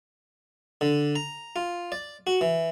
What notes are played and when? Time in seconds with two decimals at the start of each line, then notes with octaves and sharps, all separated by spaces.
0.81 D3
1.16 A#5
1.56 F4
1.92 D5
2.27 F#4
2.41 E3